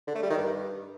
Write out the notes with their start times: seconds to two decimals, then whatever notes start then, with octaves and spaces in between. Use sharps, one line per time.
0.07 D3
0.15 A3
0.23 G3
0.30 D#3
0.38 G2